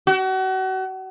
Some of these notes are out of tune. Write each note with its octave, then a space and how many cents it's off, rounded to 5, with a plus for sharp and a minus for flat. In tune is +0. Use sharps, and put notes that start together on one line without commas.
F#4 +35